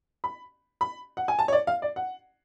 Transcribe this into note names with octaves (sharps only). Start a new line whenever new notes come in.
B5
B5
F#5
G#5
A5
C#5
D5
F5
D5
F#5